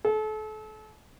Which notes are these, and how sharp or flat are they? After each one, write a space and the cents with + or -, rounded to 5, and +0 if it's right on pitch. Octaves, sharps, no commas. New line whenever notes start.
A4 -35